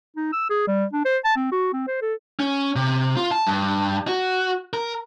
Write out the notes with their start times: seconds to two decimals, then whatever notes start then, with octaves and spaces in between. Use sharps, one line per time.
0.16 D#4
0.33 E6
0.50 G#4
0.67 G3
0.93 D4
1.05 C5
1.25 A5
1.36 C4
1.52 F#4
1.73 C4
1.87 C5
2.01 A4
2.40 C#4
2.76 C3
3.17 F4
3.31 A5
3.47 G2
4.08 F#4
4.73 A#4